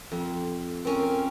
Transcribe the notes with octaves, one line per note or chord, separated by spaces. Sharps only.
F2
C4 C#4 A#4